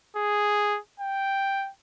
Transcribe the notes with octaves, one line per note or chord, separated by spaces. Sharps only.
G#4
G5